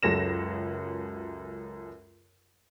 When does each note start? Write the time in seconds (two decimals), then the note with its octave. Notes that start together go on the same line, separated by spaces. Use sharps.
0.03 C#2 F#2 A4 A#6 E7